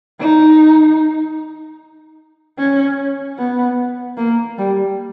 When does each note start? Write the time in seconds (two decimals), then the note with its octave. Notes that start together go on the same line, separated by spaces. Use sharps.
0.20 D#4
2.59 C#4
3.39 B3
4.17 A#3
4.58 G3